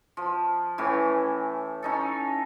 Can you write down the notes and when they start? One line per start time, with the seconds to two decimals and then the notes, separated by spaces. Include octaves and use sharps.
0.17 F3
0.78 A2 E3 C#4
1.83 C#4 D#4 A4